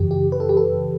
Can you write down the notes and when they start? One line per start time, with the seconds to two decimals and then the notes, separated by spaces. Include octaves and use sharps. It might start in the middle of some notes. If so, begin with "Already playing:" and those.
Already playing: F#2 C#3 E3 G4
0.11 G4
0.32 B4
0.40 A4
0.49 G4
0.57 A4